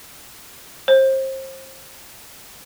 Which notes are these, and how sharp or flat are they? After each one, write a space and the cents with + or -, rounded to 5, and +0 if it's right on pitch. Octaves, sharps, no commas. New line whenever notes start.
C5 +30